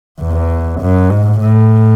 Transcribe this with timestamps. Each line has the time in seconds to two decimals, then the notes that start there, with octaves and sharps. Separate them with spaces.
0.21 E2
0.81 F#2
1.11 G#2
1.40 A2